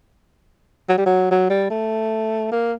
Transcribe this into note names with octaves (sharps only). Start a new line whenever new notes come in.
F#3
G3
F#3
F#3
G3
A3
A#3